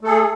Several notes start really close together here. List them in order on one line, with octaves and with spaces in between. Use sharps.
A3 A4 G#4